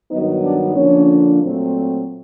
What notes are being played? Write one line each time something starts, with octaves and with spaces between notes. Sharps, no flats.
G2 D#3 F#3 B3 D#4 D#5
D4 D5
D3 F3 A#3 C#4 D4 C#5
A#2 F#3 A3 C4